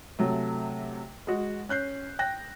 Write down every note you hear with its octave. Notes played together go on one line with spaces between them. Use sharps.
C3 F#3 A3
G#3 F#4
C#4 F#6 G6 C7
G5 F#6 A#6